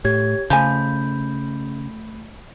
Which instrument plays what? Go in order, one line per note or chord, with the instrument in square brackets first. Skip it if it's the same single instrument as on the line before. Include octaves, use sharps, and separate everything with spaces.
[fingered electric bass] A2 [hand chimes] G4 C#5 G#6
[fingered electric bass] C#3 [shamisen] F3 G#5 [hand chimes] A3 B5 G6